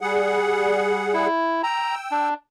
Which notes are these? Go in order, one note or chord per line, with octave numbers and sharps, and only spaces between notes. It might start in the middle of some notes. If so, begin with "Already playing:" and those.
G3 G#4 F#5
E4
G5 A#5 E6
D4